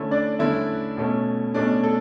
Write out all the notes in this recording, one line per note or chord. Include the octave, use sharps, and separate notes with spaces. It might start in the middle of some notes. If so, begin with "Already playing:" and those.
Already playing: D3 A3 C#4 E4
D4 D5
D3 A3 C#4 E4 E5
B2 A3 C#4
B2 A3 C#4 D4 D5
A4